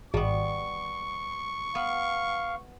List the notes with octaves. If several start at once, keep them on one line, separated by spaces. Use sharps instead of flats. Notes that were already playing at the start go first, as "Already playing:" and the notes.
G#1 G3 B3 C#6
B3 F5